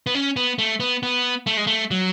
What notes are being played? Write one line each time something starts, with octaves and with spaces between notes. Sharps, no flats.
B3
C#4
B3
A3
B3
B3
A3
G#3
A3
F#3